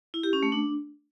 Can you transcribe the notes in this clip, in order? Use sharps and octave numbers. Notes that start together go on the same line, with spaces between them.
E4
G4
C#4
A3
D4